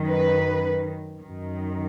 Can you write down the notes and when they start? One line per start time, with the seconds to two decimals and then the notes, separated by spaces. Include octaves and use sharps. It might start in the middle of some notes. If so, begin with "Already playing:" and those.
Already playing: F#2 D#3
0.09 B4
1.21 F#2 D#3